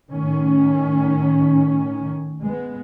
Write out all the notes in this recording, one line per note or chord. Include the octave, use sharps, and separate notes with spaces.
A2 D#3 C#4
G#3 B3